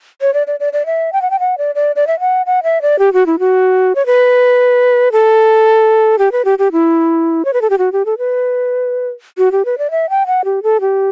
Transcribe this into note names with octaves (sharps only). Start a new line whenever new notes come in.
C#5
D5
D5
D5
D5
E5
G5
F#5
G5
F#5
D5
D5
D5
E5
F#5
F#5
E5
D5
G4
F#4
E4
F#4
C#5
B4
A4
G4
B4
G4
G4
E4
C#5
B4
A4
G4
F#4
G4
A4
B4
F#4
G4
B4
D5
E5
G5
F#5
G4
A4
G4